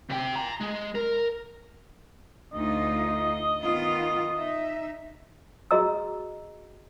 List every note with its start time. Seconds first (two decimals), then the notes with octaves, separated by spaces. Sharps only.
0.10 C3 G5
0.36 A#5 C6
0.60 G#3
0.95 A#4
2.53 D2 D#4 F4 D#5
3.62 D#3 B3 F4
4.35 D#4 E5
5.71 F#4 G#4 D#5 A#5 E6